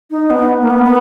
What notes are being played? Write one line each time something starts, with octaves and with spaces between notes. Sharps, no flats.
D#4
B3
A#3
B3
B3